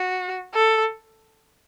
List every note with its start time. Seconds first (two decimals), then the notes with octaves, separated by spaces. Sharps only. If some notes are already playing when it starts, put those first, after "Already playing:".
Already playing: F#4
0.54 A4